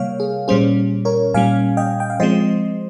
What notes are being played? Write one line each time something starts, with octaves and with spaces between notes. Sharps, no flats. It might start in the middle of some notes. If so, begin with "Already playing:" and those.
Already playing: C3 G3 A#3 C#5 F5
G#4
A#2 G3 C#4 G#4 C5
A#4 C#5
A#2 G3 C#4 F5 G#5
D#5 G5
G5
F5
F3 G#3 C4 C5 D#5